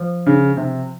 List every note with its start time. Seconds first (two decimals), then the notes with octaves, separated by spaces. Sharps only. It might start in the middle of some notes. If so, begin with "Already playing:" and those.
Already playing: F3
0.26 C#3
0.57 C3